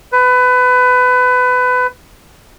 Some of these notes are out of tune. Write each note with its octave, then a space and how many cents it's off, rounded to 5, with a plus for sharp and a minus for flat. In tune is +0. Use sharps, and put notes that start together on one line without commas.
B4 +20